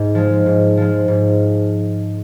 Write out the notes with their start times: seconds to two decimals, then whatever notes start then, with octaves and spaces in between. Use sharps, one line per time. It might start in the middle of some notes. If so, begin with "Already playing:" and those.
Already playing: G#2
0.15 F3 G#3
0.46 G#2
0.77 F3 G#3
1.08 G#2